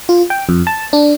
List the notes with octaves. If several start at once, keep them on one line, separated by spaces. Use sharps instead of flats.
F4
G5
F2
A5
D4